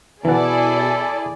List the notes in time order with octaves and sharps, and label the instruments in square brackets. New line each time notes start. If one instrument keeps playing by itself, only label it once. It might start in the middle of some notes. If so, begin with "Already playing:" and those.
[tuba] B2 [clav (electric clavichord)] E3 F#5 [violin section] E4 G#4 D5 [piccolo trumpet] A4